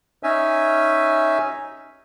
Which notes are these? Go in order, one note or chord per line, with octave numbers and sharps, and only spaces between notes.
C#4 D#4 E5 G#5